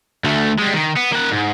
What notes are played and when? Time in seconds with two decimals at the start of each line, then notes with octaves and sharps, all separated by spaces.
0.24 D2 A3
0.59 G3 G#3
0.73 D#3
0.96 B3
1.12 A#3 F#5
1.31 G#2